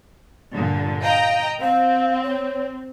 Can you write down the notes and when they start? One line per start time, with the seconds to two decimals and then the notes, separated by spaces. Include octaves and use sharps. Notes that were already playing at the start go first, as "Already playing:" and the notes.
0.55 G2 A#2 D3
1.03 D#5 F5 G5 A#5
1.61 C4 F5
2.23 C#5